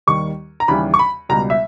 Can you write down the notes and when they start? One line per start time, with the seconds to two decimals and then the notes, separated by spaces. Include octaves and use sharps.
0.07 D#2 D#3 G3 C#6
0.60 A#5
0.68 D#2 C#3 E3 G3 B5
0.94 C#6
0.99 B5
1.29 C#2 B2 G3 A#5
1.50 E5